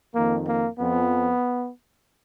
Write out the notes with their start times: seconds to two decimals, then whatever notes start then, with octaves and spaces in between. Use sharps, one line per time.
0.13 F2 D#3 A#3
0.46 A#3
0.78 F2 F3 B3